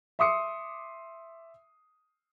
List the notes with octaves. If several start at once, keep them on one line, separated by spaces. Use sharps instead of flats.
E5 C6 D6 D#6 C7 C#7